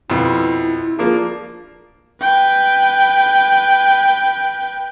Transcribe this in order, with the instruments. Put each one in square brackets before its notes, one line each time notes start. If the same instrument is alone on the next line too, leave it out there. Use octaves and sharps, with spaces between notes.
[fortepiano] F2 B2 [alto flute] E4
[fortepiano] F3 A#3 D4 [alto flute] G#4
[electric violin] B4 G5